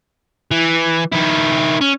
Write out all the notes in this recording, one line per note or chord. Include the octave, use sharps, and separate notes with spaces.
E3
D#3 E4
C#4